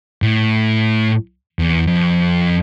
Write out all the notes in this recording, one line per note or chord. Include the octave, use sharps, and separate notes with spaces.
A2
E2
F2